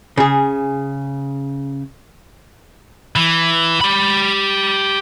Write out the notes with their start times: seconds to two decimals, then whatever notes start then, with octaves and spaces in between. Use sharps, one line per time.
0.17 C#3 G#4
3.16 E3
3.81 G4 B5